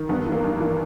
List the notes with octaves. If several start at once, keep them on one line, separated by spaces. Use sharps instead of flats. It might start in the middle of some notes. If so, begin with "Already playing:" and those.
Already playing: D#3
G2 B3
E3
A#3
G2
E3